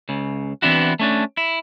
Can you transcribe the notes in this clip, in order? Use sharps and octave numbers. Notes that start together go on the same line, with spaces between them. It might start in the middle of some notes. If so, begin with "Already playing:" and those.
C#2 C#3
E3 B3 C4 D4 E4 F#4
A3 C#4 D4
E4